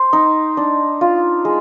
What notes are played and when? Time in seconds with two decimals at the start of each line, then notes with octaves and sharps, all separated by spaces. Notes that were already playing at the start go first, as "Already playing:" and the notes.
Already playing: C5
0.13 D#4
0.57 D4
1.01 F4
1.45 G#3